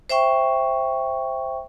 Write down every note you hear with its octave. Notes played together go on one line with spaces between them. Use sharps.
C5 E5 G5 C#6